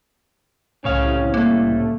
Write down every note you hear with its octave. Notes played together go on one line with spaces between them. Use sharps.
C2 A2 C#3 C#4 C#5 F5
A3 A#3